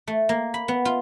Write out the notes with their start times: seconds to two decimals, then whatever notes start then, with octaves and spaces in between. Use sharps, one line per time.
0.07 A3
0.29 A#3
0.54 B5
0.68 B3
0.85 F4